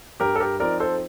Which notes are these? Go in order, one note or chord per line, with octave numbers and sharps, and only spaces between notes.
G2 G4 A#4
A4
G4 A#4
F3 C4 D#4 A#4 D5
A4 C5